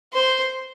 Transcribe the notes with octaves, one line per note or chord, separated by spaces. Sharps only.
C5